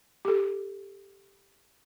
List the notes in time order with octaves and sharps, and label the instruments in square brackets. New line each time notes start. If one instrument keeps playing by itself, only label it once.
[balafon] G4 A4